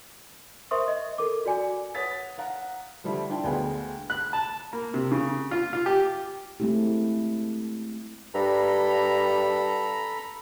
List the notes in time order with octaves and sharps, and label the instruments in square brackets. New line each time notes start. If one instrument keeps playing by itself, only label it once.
[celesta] A#4 C5 E5 C6 C#6 D#6
D#5
A4 A#4 D6
F#4 D5 G#5
[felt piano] B4 C#5 F#5 D#6 A6 B6
F5 F#5 A#5
D3 F3 G3 E4
D4 F4 G5
D2 G#3 B3 F5 G5 G#5
[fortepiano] F#6
A5
A#3
C3
C#3
F4
F4
G4
[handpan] G#3 A3 C4 E4 G4
[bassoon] G2 [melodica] A4 A#5 B5